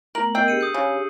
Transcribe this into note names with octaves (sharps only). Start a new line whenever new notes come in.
A3 B3 A#4 F#7
B3 A#4 D#5 G5 E6 C7
D4 G4 G#4 C#7 D#7
D#6 G6
C#3